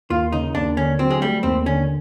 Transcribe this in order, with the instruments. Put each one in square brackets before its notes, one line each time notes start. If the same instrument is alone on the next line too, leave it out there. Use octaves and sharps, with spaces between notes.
[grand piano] D#2 [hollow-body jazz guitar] F4
[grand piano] C#3 [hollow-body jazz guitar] D#4
[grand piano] D#2 [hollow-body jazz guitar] D4
[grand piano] D3 [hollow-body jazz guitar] C#4
[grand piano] F#3 [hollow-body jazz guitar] C4
[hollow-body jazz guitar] G#3
[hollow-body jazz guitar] G3 [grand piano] A3
[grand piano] D#2 [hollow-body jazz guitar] C4
[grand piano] D3 [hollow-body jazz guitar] C#4